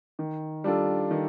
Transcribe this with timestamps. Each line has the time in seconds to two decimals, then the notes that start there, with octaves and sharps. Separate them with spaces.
0.19 D#3
0.64 G3 D4 F4 A4
1.11 D#3